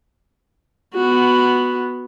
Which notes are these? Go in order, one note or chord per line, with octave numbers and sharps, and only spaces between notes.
B3 F#4